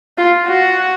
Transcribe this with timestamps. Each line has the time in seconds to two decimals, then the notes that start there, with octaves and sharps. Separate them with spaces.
0.18 F4
0.47 F#4